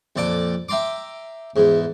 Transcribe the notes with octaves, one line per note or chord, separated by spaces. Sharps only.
F2 A#2 A4 D5 D6
E5 G5 A#5 C6 D6
E2 G#2